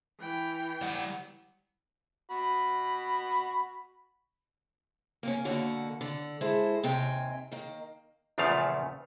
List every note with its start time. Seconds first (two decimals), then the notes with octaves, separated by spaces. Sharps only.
0.19 E3 G5
0.82 G3 F#5
2.31 F#4 B5
5.23 A#3 C4 C#4
5.45 B2 D3 A#3 F#4
6.01 D3
6.41 G#3 E4 A4 C5
6.83 D#2 C3 G5 G#5
7.51 D#3 A#3
8.38 A#1 E2 C#3 F3 A3 F5